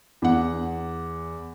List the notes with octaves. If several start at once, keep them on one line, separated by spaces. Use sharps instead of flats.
E2 F#5